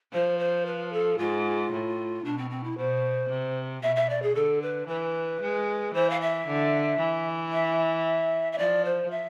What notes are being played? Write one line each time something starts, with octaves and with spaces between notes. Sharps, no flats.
F3 C5
C5
B4
A4
G#2 F4
A2
B2 D4
C4
C4
E4
B2 C5
C3
B2 E5
E5
D5
G#4
D3 A4
B4
E3 B4
G#3
E3 C5
F5
E5
D3
E3
E5
E5
F3 D5
C5
E5